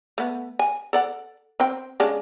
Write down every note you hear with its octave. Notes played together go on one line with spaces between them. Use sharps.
A3 B3
G#5
A4 D5 F#5
C4 C5 G5
C#3 G#3 D4